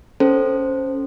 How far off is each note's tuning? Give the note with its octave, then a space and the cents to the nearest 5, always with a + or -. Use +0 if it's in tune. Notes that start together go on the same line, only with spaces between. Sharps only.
C#4 +0 A4 +0 C5 +0